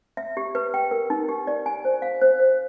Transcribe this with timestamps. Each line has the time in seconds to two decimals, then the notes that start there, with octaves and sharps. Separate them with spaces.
0.17 E5
0.37 G4
0.55 B4
0.74 G5
0.91 A#4
1.10 D#4
1.29 G4
1.47 D5
1.66 G#5
1.85 C5
2.02 F5
2.21 C5
2.40 C5